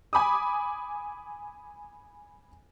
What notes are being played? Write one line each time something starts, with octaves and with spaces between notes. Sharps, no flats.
G#5 B5 D6 D#6